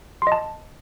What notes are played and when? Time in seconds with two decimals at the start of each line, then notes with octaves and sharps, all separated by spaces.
0.22 C6
0.27 D#5
0.32 A5